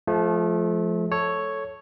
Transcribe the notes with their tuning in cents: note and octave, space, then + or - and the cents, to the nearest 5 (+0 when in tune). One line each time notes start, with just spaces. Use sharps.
F3 +0 A3 -30
A4 +0 C#5 +0